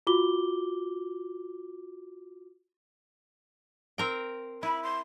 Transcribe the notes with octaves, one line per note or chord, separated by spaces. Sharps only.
F4 F#4 D6 G7
C4 A#4 G5
E4 B5
C6